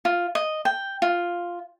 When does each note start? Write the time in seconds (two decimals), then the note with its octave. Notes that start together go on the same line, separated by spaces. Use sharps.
0.05 F4
0.35 D#5
0.65 G5
1.02 F4